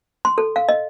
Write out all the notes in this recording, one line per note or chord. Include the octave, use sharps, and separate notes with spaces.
C6
A4
F5
D#5